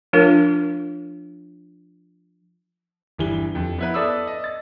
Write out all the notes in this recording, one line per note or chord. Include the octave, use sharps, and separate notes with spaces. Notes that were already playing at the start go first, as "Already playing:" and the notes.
F3 A3 D4 F4 A#4
G1 E3 G3 G7
F2
B3 E4 B4
A4 B4 D5 E5 D#6 E6
D#5
A6